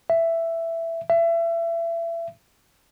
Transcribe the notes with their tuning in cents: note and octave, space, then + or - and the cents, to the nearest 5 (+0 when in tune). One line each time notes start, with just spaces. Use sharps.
E5 +10
E5 +30